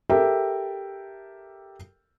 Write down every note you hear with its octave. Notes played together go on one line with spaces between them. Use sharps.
G4 A4 A#4 E5 G5